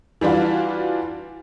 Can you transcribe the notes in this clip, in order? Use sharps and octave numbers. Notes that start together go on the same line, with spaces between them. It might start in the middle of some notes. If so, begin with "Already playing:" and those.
E3 G3 D4 F4 F#4